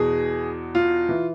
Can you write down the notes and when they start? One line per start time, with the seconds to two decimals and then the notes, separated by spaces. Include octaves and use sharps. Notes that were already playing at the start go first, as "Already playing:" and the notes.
Already playing: E2 B2 G#4
0.75 F4
1.09 E3